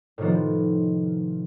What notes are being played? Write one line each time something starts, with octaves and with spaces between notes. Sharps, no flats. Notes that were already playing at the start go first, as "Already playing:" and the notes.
A2 C3 D#3 F3 B3